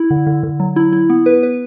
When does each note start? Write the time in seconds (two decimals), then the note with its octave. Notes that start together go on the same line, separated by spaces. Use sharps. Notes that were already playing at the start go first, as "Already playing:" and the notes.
Already playing: E4
0.10 D3
0.27 D3
0.43 D3
0.60 F#3
0.76 E4
0.92 E4
1.10 B3
1.26 B4
1.43 B4